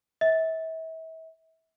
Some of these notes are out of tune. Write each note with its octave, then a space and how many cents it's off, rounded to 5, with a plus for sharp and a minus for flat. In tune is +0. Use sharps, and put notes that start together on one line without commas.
E5 -35